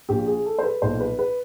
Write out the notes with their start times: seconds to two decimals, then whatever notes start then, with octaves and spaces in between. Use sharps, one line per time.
0.09 A#1 A#2 G4
0.26 G#4
0.45 A4
0.59 C5
0.63 B4
0.82 B1 A#2 C5
1.00 B4
1.19 B4